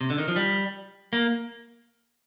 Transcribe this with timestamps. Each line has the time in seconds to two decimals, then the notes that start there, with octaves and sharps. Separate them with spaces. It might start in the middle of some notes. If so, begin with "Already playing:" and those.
0.01 C3
0.10 D3
0.18 D#3
0.28 F3
0.36 G3
1.13 A#3